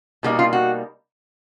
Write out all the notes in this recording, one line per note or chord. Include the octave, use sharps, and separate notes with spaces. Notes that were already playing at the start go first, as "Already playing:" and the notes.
B2 G3 A#3 D#4 G4
F4
F#4